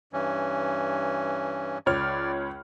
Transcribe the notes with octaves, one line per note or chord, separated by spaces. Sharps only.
G2 E3 C#4
C#2 C#5 D5 F6